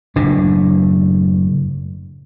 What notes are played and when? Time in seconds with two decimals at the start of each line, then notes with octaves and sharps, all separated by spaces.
0.16 F#1 A2 D4